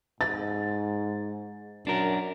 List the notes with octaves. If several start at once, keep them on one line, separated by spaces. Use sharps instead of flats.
G#2 A6
F#2 D4 A#4